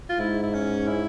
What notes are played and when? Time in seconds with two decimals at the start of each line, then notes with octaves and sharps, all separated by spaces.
0.09 F4
0.19 G#2 E4
0.43 E4
0.54 C#4
0.87 E4